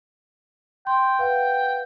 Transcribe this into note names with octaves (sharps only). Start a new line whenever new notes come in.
G5 C6
B4 F5 F#5